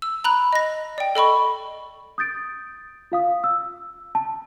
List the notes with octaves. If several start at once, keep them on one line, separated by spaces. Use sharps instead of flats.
E6
A#5 B5 F#6
D#5 A#6
D5 G5
A4 D#5 B5 C#6
D#6 G6 A6 D7
F4 F5 D#6
E6
A5